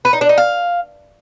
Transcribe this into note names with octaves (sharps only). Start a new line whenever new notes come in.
B4
D#4
D4
D#4
F5